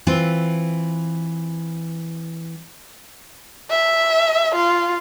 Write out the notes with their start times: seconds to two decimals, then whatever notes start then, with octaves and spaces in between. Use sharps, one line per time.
0.07 E3 C4 F4
3.70 E5
4.55 F4